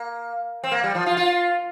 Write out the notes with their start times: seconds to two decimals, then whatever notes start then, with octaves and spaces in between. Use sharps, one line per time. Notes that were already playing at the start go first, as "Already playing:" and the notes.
Already playing: A#3
0.64 C4
0.72 A#3
0.84 G3
0.95 F3
1.06 F4
1.17 F4